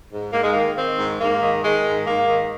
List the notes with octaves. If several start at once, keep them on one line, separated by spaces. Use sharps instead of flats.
G#2
G#2 A#3
G#3
D#3 A#3
D#3 C4
G#2
G#2 A#3
D#3
D#3 G#3
G#2
G#2 A#3
D#3